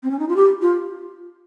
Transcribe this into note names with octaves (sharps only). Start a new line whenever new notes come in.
C4
C#4
D#4
F4
G4
F4